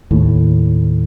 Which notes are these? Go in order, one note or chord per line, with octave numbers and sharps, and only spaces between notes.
D#2 A2